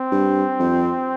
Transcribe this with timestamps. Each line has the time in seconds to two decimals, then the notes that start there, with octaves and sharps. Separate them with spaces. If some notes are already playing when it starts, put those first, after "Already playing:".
Already playing: C4
0.12 G2
0.59 F2